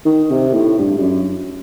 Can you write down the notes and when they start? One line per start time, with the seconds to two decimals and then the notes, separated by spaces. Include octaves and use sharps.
0.05 D#3
0.31 C3
0.54 A2
0.79 G2
0.98 G2
1.02 F#2